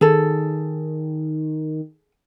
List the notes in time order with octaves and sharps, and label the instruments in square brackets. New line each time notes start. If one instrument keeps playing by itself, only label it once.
[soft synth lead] D#3 [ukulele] G#4 A4